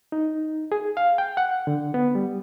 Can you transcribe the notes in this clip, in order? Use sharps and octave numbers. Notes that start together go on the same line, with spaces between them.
D#4
G#4
F5
G5
F#5
D3
B3
G3